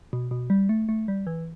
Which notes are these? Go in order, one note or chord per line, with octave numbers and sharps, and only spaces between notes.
B2
B2
G3
A3
A3
G3
E3